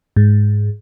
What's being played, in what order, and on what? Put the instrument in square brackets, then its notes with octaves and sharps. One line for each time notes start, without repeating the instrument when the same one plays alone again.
[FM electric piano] G#2